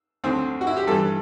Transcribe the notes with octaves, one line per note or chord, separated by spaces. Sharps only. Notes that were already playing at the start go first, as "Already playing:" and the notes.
D2 D3 C4
F#4
E4
G4
G2 E3 A4